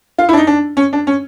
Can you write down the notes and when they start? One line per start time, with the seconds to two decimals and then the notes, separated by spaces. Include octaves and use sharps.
0.18 F4
0.29 E4
0.33 D4
0.37 D#4
0.47 D4
0.77 C#4
0.93 D4
1.07 C#4